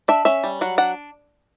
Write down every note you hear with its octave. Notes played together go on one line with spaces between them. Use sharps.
D4 E5
C#4 E5
G3
F#3 F#5
D4 F#5